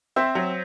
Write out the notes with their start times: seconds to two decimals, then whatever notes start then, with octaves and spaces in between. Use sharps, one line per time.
0.16 C4 C5 E5
0.35 F#3